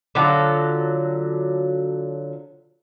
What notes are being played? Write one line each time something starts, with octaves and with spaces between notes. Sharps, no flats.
D3 F3 F#3 A4